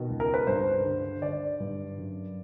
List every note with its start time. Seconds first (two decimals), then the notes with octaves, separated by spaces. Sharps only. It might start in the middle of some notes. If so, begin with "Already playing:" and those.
Already playing: B2 D#3
0.10 C#2
0.20 A#4
0.34 B4
0.47 G2 C5
0.86 D3
1.22 D3 D5
1.60 G2
1.97 F#2